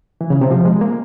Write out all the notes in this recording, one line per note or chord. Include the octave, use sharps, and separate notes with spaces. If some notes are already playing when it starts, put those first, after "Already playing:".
E3
C#3
C3
F3
G#3
A#3